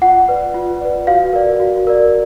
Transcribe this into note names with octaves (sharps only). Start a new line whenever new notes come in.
F4 F#5
B4 D5
F4
B4 D5
F#4 F5
A#4 D5
F#4
A#4 D5